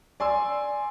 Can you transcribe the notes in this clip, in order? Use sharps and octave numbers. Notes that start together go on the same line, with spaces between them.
D5 G#5 C6 E6